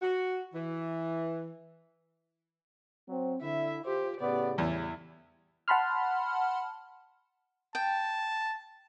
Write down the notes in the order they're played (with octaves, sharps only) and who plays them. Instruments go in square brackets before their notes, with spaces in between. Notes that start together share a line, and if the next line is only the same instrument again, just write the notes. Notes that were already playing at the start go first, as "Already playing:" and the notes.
[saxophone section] F#4
E3
[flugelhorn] F#3 [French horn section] C4
[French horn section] D3 [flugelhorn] E4 [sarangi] E5
[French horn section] F4 [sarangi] G4 [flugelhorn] C5
[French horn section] A2 C#3 G4 [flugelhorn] B3 [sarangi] D5
[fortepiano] E2 [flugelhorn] G3 [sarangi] E4
[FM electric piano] F#5 A5 B5 C6 F6
[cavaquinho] G5 [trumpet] A5